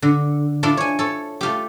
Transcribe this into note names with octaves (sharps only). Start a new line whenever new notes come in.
D3
D4 E4 F4 A4
C#5 G#5
A4 C#5
A3 F4 G4